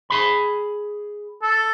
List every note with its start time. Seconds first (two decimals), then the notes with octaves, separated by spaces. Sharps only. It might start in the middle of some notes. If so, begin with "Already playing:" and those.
0.10 G#4 B5
1.42 A4